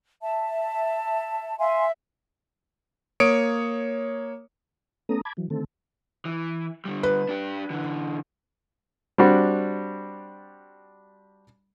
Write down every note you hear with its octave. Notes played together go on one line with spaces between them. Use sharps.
E5 A5
E5 F5 G#5 C6
A#3 C#5 D#6 C#7 D7
A3 B3 C#4 A4 A#5 D#6
A5 B5 D6 G#6
E3 F#3
D3 D#3 A3 C4 A4
E3
D3 G3
B4
D4 G4
D3 E3
G3 C4 D4 F#4